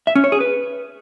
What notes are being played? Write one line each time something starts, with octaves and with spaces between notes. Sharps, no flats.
E5
C#4
C#5
G#4
B4